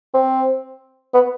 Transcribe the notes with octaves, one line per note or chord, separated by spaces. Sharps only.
C4
B3